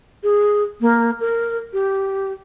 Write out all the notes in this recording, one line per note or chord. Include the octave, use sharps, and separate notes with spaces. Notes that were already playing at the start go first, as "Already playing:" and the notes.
G#4
A#3
A#4
G4